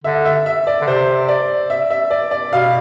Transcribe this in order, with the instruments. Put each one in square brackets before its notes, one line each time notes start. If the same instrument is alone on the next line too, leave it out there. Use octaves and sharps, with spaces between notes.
[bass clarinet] D3 [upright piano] E5
[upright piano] E5
E5
D5
[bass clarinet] D3
[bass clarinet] C3 [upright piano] C5
[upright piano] D5
E5
E5
D5
D5
[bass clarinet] B2 [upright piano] F5